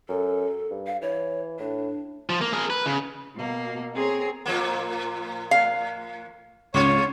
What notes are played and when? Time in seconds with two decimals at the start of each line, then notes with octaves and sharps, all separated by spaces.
0.09 F#2 A4
0.70 G2
0.87 F5
1.02 E3 C#5
1.60 A2 D4
2.30 F3
2.41 A#3
2.53 G#4 A#4
2.70 B4
2.86 C#3
3.34 B2 A#3
3.94 C4 G#4 C#5 A#5
4.46 A2 F3 A#3
5.51 F5
6.74 C#2 G#2 C3 F4 C#5